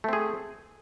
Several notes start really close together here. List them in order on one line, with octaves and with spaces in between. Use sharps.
A3 C4 G#4